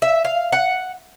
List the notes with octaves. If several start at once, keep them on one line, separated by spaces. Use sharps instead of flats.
E5
F5
F#5